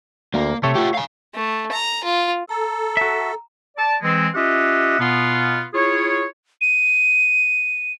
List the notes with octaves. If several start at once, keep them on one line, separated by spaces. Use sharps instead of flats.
D2 A#3
C3 A3 A4 C#5
F4 G4
F5 G#5
A3
A#5
F4
A4 A#5
F#4 E5
D5 A5
E3 G#3 C4
C#4 F4 G4 D#5 E5 F#5
B2 B3 F4
E4 F4 G#4 C#5
D#7